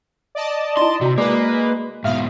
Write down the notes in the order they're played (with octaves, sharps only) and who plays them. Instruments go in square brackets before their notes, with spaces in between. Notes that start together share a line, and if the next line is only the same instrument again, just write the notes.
[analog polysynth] D5 D#5 A5
[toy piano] D#4 E4 [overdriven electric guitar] C6
[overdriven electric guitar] C3 [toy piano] F#4 A#5
[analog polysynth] G#3 B4 [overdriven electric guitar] A#3 [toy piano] G#4 D5 D#5
[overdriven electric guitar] G#2 B2 [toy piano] E5 [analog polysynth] F5